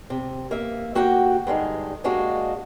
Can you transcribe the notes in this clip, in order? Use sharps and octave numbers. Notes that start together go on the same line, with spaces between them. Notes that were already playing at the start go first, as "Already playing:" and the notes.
C3
A#3 E5
A#3 F#4 G4 F#5 G5
G2 D3 G#3 D#4
G#3 A#3 D4 F#4 G4